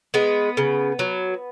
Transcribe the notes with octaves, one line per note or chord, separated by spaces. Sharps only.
G#3 B3
C#3
F#3